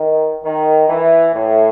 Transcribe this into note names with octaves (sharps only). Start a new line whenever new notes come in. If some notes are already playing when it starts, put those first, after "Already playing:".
Already playing: D#3
D#3
E3
A2